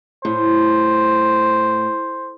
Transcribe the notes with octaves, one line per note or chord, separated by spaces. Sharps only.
A2 C5